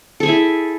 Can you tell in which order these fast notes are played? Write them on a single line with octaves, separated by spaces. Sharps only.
A4 G#4 G#5 E4